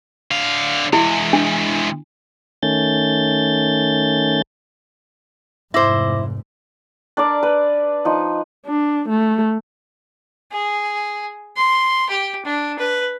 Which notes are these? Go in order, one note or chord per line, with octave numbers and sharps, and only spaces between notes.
D3 F5
E3 G#3 E4
D4
D#3 A3 C#4 G6 A6
F1 G#2 E4 C5 D6 A#6
D4 A#4 D5
B4
F3 D#4
D4
A3
G#4
C6
G4
D4
B4